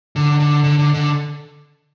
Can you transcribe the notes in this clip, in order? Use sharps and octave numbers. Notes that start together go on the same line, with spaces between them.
D3
D3
D3
D3
D3